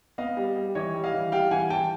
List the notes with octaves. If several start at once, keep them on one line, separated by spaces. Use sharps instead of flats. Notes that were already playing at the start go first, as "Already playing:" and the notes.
B3 D#5 F5
G3
G3
E3 C#5 D#5
G3
D#5 F5
E3
G3 F5 G5
E3 F#5 G#5
E3 G5 A5